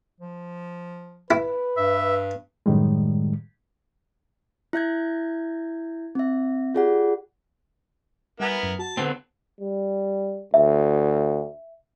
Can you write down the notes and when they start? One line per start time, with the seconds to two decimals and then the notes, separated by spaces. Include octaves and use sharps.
0.20 F3
1.31 E4 B4
1.77 G2 E5
2.66 F#2 A2 D#3 G3 G#3
4.73 E4 E5 G6 G#6
6.15 C4 E5
6.75 F4 G4 G#4 D5 F#5
8.40 G3 B3 E4 A#4 F#5 G#5
8.63 F#2
8.79 F#4 A5
8.97 D3 B3 C4
9.61 G3
10.54 D2 E5